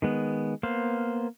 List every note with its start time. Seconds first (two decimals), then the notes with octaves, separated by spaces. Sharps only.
0.02 D#3 G#3 B3
0.63 A#3 B3 C5 F5